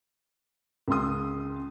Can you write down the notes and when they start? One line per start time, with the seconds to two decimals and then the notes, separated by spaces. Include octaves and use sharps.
0.88 C#2 C#3 C6 D#6